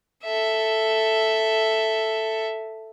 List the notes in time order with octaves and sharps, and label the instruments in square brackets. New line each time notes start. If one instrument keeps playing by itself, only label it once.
[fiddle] A4 E5